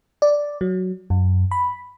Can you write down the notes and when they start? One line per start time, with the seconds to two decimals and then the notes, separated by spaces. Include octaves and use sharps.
0.22 D5
0.61 F#3
1.10 F#2
1.51 B5